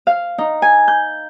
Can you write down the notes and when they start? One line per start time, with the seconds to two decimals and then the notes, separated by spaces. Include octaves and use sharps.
0.07 F5
0.38 D#4
0.62 G#5
0.88 G6